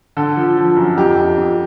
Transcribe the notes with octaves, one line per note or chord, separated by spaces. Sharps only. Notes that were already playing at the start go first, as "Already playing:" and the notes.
D3 A4
F3
F3
F#2
F2 G4
F2
F2